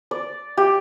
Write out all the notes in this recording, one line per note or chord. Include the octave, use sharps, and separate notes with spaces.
D5
G4